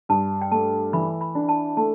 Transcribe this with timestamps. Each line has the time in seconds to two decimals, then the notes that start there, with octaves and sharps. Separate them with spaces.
0.09 G2 A5
0.41 G5
0.51 A3 A5
0.93 E3 B5
1.21 B5
1.35 D4
1.49 A5
1.77 A3 A5